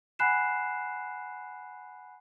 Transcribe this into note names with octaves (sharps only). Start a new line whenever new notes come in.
F#5 G#5 B5 F#6 C7 E7